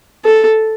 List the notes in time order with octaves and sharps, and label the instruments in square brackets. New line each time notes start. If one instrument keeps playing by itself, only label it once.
[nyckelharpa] A4